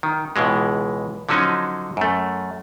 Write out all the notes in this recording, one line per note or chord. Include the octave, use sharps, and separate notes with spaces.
D#3
C#2 B2 E3 G#3
D3 F3 F#3 C#4 D#4
F#2 A3